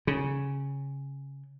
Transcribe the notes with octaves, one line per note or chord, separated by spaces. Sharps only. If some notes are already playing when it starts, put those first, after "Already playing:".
C#3